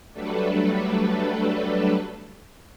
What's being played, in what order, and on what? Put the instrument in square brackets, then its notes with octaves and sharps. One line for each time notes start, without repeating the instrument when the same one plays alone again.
[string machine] F#3 G3 A3 D4 A4 B4